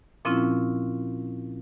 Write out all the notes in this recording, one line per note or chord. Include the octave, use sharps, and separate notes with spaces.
A#2 F3 C4 C#4 E4 F4